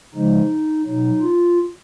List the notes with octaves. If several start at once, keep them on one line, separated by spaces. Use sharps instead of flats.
C#3 F3 G#3 D#4
B2 F#3 D#4
F4